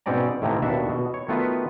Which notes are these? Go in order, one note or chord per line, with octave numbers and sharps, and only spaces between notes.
G#2 B2 C4 C#4 D5 A#5
A2 C3 D#3 E3 A3 A#3
D#2 B2 D4 F#4 E5
B2
C#5
D#3 A3 B3 F4 F#4 B4